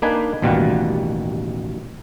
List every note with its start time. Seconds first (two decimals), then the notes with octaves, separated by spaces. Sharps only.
0.02 A#3 D4 D#4 B4 G#5
0.42 A1 D#2 B2 G3 F4 F#5